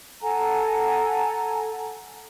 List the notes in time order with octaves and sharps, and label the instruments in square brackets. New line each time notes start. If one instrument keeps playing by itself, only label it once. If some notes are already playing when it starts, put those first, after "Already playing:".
[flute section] A4 F#5 G#5 A#5